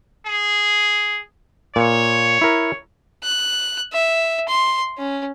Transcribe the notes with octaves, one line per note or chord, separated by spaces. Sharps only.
G#4
A#2 C#5
E4 A#4
F#6
E5
C6
C#4